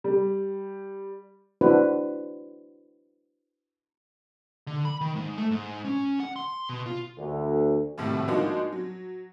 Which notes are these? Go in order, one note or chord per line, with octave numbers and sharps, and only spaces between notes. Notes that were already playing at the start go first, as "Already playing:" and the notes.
G3
D4 E4 F#4 B4 C5
D3
B5
D#3
G#2
A3
G#2
C#4
F#5
C6
B2
F4
D2
G#1 D#2 A2 C3 G3
F3 G#3 A#3 D4 D#4 F#4
F#3